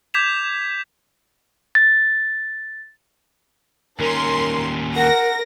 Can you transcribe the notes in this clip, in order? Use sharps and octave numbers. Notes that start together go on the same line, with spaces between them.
D6 G6 G#6 B6 E7 F7
A6
D#2 C#4 A#4 C6
A#4 F#5 A#6